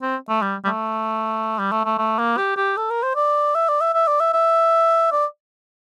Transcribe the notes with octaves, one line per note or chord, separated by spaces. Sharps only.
C4
A3
G3
G3
A3
G3
A3
A3
A3
A#3
G4
G4
A4
A#4
C5
D5
E5
D5
E5
E5
D5
E5
E5
D5